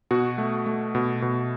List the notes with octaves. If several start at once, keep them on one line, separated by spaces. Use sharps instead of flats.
B2 F#4
A3
A3
B2
B2